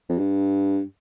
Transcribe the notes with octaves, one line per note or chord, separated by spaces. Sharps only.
F2
G2